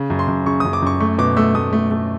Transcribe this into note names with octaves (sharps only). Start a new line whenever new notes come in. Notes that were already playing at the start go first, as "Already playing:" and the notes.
Already playing: C#3
F#2
C6
F#2
C#3 C#6
D#6
F#2
D6
F#2 C#6
A3 C#6
B2 D6
A3 E6
A3 D#6
A3
A3